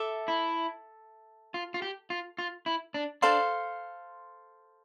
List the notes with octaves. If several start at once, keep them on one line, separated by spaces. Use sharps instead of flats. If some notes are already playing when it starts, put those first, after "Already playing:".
Already playing: A4 E5 A5 D6
E4
F4
F4
G4
F4
F4
E4
D4
D4 A4 C5 F5 C6